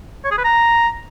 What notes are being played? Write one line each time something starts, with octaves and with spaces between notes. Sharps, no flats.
C#5
G#4
B4
A#5